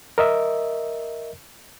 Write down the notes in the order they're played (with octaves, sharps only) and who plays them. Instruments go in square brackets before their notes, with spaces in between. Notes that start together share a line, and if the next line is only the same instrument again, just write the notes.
[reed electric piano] A#4 D#5 E5